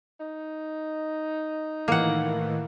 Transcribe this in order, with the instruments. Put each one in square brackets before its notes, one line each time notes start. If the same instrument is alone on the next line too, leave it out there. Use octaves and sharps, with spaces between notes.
[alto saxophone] D#4
[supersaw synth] A2 D#3 E3 [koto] A#3 F#5